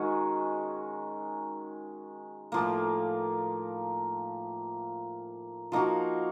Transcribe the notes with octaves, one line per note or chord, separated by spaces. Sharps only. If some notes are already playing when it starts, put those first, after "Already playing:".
Already playing: D#3 G#3 C#4 F#4
A2 F3 A#3
F3 A#3 D#4 F#4